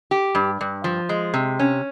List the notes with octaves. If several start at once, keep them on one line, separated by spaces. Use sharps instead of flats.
G4
G2
G2
F3
G#3
C3
C#4